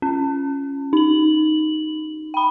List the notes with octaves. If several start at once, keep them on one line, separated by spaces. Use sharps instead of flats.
C#4
D#4 F#7
G5 B5